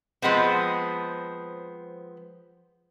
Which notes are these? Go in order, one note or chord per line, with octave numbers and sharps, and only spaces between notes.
F3 G#3 B3 C4